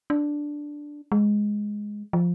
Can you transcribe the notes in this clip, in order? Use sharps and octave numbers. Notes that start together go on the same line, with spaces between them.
D4
G#3
F3